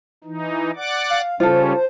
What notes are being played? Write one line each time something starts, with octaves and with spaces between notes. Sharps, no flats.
E3 D#4
D5 F#5 D6
F5
C#3 G3 C#4 F4 A4 C5